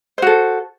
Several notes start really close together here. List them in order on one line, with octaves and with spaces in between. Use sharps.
C5 F#4 A4